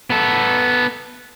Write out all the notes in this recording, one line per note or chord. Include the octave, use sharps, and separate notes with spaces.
B3 A4